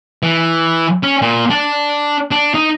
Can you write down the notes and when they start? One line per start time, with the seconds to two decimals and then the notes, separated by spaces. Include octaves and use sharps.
0.23 E3
1.03 C#4
1.22 A#2
1.50 D4
2.31 D4
2.54 D#4